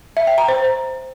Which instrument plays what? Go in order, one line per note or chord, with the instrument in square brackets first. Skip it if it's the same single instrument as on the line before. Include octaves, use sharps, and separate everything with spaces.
[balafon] E5
G5
A#5
C5